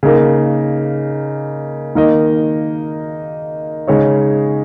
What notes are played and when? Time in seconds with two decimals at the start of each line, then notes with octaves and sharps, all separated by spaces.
0.03 C#3 A#3 D#4 A#4
1.95 D#3 A#3 D#4 A#4 D#5
3.87 C#3 G#3 D#4 G#4 C#5